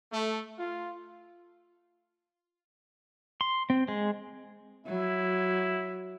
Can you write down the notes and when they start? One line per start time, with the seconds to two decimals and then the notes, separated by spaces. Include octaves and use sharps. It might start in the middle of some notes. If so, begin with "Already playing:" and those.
0.12 A3
0.58 F4
3.41 C6
3.70 C4
3.88 G#3
4.86 F#3 E4